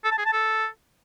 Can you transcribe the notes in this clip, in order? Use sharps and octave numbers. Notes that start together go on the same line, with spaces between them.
A4
A5
G#4
A5
A4